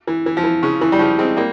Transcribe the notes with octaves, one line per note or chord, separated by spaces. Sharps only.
E3
E3
F3
E3
C#3
E3
G3
C#3 F3
G#3 C4
G3 A#3